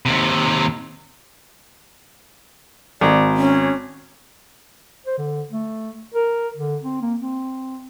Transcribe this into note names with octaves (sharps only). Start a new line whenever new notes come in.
D#2 C3
G#1 D5
C#4
C5
D3
A3
A#4
D3
C4
A#3
C4